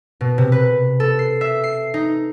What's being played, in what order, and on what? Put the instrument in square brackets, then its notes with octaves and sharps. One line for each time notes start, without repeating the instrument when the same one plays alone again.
[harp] B2
C3
B4
A4
C7
E5
C7
D#4